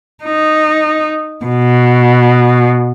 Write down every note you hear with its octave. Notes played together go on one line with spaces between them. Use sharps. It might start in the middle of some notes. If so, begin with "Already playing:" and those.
D#4
B2